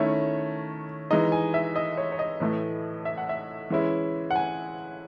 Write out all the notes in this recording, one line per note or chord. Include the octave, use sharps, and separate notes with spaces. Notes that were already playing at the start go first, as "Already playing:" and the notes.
Already playing: D#3 A3 C#4 E4 C#5
E3 G#3 D#4 D#5
G#5
E5
D#5
C#5
C#5
D#5
A2 E3 A3
E5
F#5
E5
E3 G#3 C#4 E4
F#5
G#5